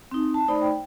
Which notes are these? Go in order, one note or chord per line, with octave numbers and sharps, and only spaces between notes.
C4 D#4
A5
A3 D#4 C5 D5 B5
G5